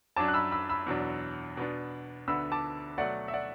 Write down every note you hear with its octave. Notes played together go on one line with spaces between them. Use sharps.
F#2 F#3 D4 A5 D6
F#6
B5 E6
B5 E6
B5 E6
E2 B2 F#3 D4
B2 B3 D4
D2 D3 B3 D4 B5 E6
A5 D6
B2 F#3 A3 D5 F#5
E5
D5 F#5